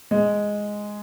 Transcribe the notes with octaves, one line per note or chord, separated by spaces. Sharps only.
G#3